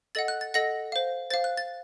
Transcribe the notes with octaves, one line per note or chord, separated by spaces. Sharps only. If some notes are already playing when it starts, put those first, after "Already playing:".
A4 D#5 F#5 A6
F#6
A6
A4 D#5 F#5 A#6
C5 F5
C5 F5 A6
F#6
A6